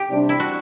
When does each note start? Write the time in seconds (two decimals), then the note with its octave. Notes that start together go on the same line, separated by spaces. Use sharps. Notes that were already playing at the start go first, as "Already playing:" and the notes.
Already playing: G4
0.10 C3 G3 D4
0.29 E4
0.40 F#4